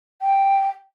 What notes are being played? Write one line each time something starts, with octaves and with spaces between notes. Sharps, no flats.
G5